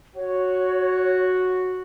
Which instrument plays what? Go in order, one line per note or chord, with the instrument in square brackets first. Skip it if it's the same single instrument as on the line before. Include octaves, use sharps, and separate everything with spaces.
[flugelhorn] F#4 [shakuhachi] C#5